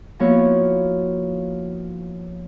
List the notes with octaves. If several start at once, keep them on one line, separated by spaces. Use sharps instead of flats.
F3 A#3 B3 E4 F#4 C#5